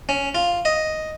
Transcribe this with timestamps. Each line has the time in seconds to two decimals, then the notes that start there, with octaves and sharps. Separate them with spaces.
0.09 C#4
0.35 F4
0.65 D#5